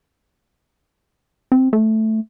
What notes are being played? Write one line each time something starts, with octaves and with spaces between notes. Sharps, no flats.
C4
A3